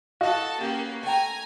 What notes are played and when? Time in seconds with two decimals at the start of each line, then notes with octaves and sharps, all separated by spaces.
0.21 F#4 A4 D#5 F5 A5
0.61 A#3 B3 C#4 G4
1.03 A3 G5 G#5 A#5